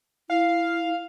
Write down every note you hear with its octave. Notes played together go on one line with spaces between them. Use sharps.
E4 F5